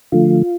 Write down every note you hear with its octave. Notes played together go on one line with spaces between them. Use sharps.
D3 F3 A3 F4